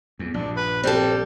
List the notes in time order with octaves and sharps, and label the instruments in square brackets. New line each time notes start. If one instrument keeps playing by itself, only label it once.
[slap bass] E2
[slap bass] A#1 G2 [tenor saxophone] D4
[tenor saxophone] B4
[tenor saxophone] G3 [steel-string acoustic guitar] C4 A4